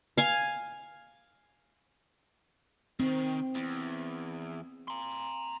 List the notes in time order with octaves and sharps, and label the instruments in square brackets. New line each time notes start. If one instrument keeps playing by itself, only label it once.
[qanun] F5 G#5
[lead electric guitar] D#3 [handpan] C4
[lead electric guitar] E2
A#5 C6